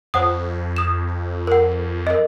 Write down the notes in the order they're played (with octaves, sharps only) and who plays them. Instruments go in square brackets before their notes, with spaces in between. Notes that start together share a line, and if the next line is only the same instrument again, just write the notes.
[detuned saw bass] F2 [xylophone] C5 F#5 D#6
[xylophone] D#6 E7
A#4 F#5
A#4 D#5